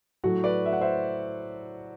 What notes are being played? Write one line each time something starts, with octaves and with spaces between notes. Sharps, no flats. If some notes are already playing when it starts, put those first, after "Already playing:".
A2 F#3 A3 F#4
B4 D5
E5
F#5
C5 E5